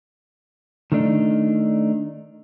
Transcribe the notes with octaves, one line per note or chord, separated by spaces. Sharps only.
D#3 A3 D4 D#4